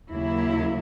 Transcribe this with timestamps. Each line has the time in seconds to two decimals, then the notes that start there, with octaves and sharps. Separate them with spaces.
0.12 D#2 C#3 F#3 A#3 E4